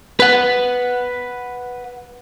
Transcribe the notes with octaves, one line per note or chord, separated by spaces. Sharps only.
B4 F#5